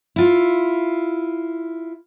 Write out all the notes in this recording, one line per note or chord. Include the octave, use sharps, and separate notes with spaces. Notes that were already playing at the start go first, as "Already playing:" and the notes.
E4 F4